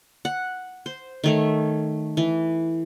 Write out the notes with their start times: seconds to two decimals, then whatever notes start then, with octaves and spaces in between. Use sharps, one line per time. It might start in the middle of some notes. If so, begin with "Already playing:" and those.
0.25 F#5
0.86 C5
1.24 D#3 A3 C#5
2.17 E3